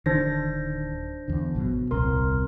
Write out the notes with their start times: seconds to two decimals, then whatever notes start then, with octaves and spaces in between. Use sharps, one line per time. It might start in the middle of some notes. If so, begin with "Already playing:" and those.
0.06 D1 D3 D#3 D4 C5 A#6
1.28 E2 D3
1.55 G#1 B2 F#3
1.91 D#1 C2 C4 A#4 C6